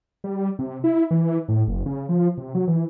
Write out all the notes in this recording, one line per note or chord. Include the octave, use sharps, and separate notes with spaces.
G3
C3
E4
E3
A2
F#1
C#3
F3
C3
F#3
E3